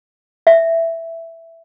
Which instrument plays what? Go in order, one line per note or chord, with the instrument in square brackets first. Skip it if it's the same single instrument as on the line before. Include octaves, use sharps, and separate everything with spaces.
[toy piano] E5